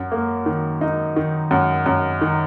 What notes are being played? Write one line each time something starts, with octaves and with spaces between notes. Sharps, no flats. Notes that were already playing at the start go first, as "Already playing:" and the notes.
Already playing: F#2
A#3
D#3
D#4
D#3
F#2
F#2
D#3